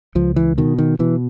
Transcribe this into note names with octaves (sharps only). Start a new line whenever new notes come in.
C#2 F3
E3
B2 D#3
D#3
B2 E3